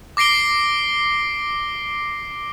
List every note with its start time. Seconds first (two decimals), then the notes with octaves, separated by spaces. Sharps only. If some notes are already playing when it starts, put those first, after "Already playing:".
0.17 D6 A#6 C7 D7 G7